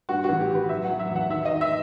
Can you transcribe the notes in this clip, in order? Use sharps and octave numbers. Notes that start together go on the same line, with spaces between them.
G2 F#4
F#4
A1
G4
D#3 B4
F#3 E5
F#5
F#3
E5
E2
F#5
D#3 E5
D#5
D#3
E5